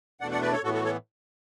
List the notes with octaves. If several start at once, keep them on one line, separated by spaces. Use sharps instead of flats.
E2 B2 A3 D4 D5 F#5
D5 F#5
B4 D5
A4 C#5
A2 E3 B3 F#4 A4
F#4 A4
A4 C#5